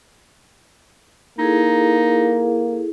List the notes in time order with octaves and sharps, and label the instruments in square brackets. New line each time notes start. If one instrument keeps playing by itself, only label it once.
[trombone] A#3 [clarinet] D#4 [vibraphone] E4 G#4 A4